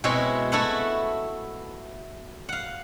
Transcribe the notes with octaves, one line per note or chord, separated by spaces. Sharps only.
B2 G#3 C4 E4 B4 C#5
A3 E4 F#4 A4 B4 F#5
F5 F#5